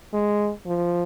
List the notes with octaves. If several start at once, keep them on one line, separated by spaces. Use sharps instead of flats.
G#3
F3